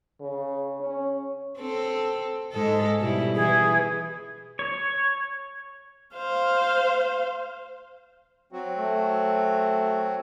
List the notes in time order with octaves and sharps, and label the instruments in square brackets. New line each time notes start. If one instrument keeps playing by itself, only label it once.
[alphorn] C#3
C#4
[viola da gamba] C4 A4
G#2 G#3 A4
B2 G3 E4
[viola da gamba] E3 [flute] G#4
[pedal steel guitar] C#5
[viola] C5 F5
[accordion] F#3 C4 F#4
[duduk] A3